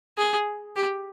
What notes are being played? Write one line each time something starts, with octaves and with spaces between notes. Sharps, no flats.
G#4
G4